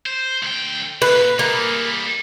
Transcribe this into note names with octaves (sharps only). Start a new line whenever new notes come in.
C5
D2 G5
C2 A#2 B4
G3 A#3 G#4